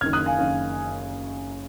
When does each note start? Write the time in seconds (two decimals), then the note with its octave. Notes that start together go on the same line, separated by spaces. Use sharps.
0.01 F#1 F#2 D#3 F6 G#6
0.13 D#6 F#6
0.26 F5 G#5
0.38 F#1 F#2 D#3 F5